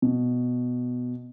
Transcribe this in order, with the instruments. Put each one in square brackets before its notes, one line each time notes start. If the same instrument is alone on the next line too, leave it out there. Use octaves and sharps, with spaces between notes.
[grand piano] B2